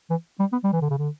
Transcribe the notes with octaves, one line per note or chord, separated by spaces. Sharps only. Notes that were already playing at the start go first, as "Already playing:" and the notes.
E3
G3
B3
G3
E3
D3
C#3
D3